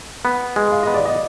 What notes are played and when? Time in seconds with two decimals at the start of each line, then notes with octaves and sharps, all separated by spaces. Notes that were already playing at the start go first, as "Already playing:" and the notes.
0.25 B3
0.56 G#3
0.72 F5
0.83 B3 D#5
0.94 D5
1.05 D#5